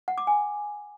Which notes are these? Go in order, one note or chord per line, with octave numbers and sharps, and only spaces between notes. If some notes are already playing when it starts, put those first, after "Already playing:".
F#5
D6
G#5